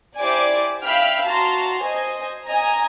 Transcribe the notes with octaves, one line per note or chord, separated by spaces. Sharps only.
E4 G4 C5 D5 G#5 D6
E5 F5 G5 B5 F6
F#4 A5 A#5 C6
C5 D#5 G#5
D#5 G#5 A#5